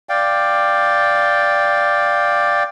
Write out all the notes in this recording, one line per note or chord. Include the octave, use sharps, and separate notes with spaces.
D5 F5 G5